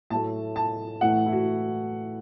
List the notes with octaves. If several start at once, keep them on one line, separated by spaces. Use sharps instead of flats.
A2 F#3 A3 A5
A5
A2 E3 A3 F#5
E4
F#4